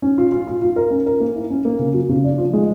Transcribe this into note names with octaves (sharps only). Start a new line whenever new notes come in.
C#4
F4
F4
F4
F4
A#4
C#4
A#4
A#3
E4
C#4
A#3
C#3
F#3
C#3
D4
F3
G#3